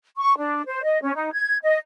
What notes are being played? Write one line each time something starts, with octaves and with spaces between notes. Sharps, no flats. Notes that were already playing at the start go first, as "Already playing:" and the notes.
C#6
D4
C5
D#5
C#4
D#4
G#6
D#5